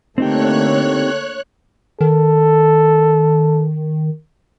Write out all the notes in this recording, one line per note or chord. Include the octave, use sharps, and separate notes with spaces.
D3 A3 A#3 C4 D#4 G4 C#5 F#6
D#3 A4